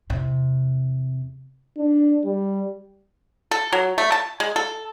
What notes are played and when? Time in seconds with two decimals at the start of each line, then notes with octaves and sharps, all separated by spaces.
0.10 E2 C3
1.77 D4
2.25 G3
3.51 A4
3.72 F#3
3.98 A3
4.12 A5
4.40 G#3
4.56 A4